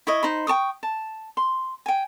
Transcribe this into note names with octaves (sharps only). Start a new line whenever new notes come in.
E4 C#5 D#5
D#4 C5 B5
G5 A5 C#6 D#6
A5
C6
G5 G#5